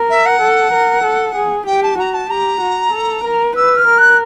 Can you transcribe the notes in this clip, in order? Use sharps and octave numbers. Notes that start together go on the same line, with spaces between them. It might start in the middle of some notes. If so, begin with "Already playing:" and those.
Already playing: A#4
E5
F#5
A4
A#4
A4
G#4
G4 G5
A5
F#4 A#5
A5
G4 A#5
F#4
A4
A#4
B4 E6
F6
A#4
F#6